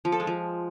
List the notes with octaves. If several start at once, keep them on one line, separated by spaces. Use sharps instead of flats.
F3
A4
G#3
F3